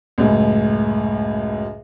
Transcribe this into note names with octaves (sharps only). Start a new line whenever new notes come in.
C#2 F#2 A2